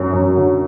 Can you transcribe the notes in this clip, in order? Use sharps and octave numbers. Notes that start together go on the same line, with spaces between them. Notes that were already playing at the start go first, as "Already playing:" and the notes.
Already playing: F#2 F#3
F#2
D3